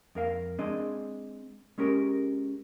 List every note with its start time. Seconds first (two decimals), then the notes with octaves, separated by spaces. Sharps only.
0.15 F2 A#4 F5
0.59 G#3 C4 D4 G#4 D#5
1.78 G#3 C#4 G4 A#4